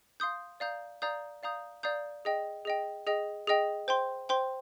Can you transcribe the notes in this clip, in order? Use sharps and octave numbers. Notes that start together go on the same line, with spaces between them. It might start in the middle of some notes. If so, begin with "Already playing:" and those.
F5 C6 D#6 G6
D5 F5 A#5 D#6 G6
D5 F5 A#5 D#6 G6
D5 F5 A#5 D#6 G6
D5 F5 A#5 D#6 G6
G#4 D#5 G5
G#4 D#5 G5
G#4 D#5 G5
G#4 D#5 G5
C5 G5 C6
C5 G5 C6